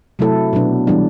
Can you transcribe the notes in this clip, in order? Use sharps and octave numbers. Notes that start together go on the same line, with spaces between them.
C3 F#3 A3 E4 A4
B2 F#3 B3 D4
E3 G3 D4